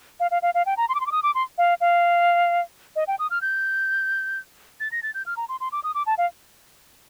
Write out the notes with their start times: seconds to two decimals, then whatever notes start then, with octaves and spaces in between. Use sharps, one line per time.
0.20 F5
0.31 F5
0.42 F5
0.54 F5
0.66 G5
0.77 A#5
0.89 C6
0.95 D6
1.00 C6
1.06 D6
1.12 D#6
1.23 D6
1.35 C6
1.58 F5
1.81 F5
2.96 D#5
3.07 G5
3.19 D#6
3.30 F6
3.42 G6
4.80 A6
4.92 A#6
5.03 A6
5.14 G6
5.26 F6
5.37 A#5
5.49 C6
5.60 C6
5.72 D6
5.84 D#6
5.95 D6
6.06 A5
6.18 F5